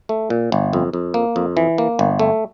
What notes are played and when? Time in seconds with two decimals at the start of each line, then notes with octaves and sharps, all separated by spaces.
0.09 A3
0.30 A#2
0.52 G1
0.73 F2
0.93 F2
1.14 A#3
1.36 F2
1.57 E3
1.78 A#3
1.99 G1
2.19 A3